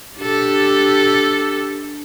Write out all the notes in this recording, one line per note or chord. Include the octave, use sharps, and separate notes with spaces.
D4 G4 A4